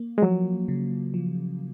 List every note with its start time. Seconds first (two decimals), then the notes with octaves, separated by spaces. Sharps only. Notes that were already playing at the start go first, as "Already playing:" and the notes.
Already playing: A#3
0.18 G#3
0.22 F3 F#3
0.68 C#3
1.14 F3